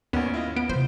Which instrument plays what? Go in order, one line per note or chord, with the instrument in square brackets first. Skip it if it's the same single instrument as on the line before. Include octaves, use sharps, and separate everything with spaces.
[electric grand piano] G#1 C#4 [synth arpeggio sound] D#2 B3
[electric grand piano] E4 F4 D#5
[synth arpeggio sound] B3 [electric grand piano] D7
[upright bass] C3 F4 [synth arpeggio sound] C5